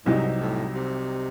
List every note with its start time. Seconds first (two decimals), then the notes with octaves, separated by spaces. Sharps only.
0.06 C2 G#2 C3 F#3 C4 D#4
0.41 A2
0.74 C3